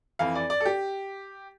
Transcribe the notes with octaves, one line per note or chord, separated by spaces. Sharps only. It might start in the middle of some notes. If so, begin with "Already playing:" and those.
F2 E3 F5
D5
D5
A4
G4